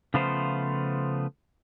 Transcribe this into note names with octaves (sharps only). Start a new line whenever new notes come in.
C#3 F3 A3 B3 F4 C5